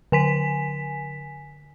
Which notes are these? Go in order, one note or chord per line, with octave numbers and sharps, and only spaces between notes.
D3 G#5 B6